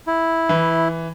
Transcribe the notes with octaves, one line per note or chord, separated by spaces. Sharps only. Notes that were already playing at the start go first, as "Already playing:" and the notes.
E4
E3